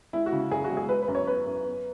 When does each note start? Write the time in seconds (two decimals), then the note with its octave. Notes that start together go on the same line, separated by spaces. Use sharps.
0.13 G#3 E4
0.26 F#4
0.32 C#3
0.51 F#2 G#4
0.64 F#4
0.70 G#3
0.77 G#4
0.89 B3 B4
1.02 B4
1.08 F#2
1.15 C#5
1.27 B3 B4
1.47 F#2
1.65 B3